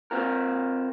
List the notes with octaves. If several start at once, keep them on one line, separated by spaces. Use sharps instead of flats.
C4 F4 A#4